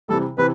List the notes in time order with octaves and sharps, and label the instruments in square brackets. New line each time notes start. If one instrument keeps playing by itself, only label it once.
[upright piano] C3 E3 G3 [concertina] A4
[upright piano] C3 E3 [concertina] B4